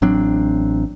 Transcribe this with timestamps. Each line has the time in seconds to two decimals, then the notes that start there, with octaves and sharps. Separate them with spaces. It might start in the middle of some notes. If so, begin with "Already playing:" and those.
0.02 A1 F#3 C4 D4